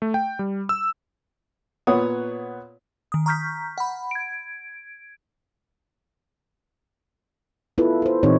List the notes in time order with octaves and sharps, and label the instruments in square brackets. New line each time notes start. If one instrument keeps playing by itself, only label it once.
[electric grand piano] A3
G5
G3
E6
[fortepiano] A#2 B3 C#5 F#5 D#6
[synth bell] D#3 D#6
A#5 C#6 F6 G6 B6
F#5 B5
G#6 D7
[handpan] B3 E4 F4 A4 B4
A4 C5
A#2 E3 C4 D#4 G4 C#5